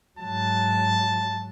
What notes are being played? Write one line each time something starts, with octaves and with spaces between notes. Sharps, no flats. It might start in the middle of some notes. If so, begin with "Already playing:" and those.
G#2 F#3 A5